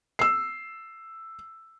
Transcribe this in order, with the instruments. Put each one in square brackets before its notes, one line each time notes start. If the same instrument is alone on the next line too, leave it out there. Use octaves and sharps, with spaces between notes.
[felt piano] E6 C7